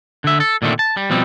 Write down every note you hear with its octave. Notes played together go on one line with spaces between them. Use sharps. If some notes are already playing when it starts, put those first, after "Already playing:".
D3 E5
A4
A#2 D3 D#3 A3 C4
A5
G3
B2 F3 G3 C4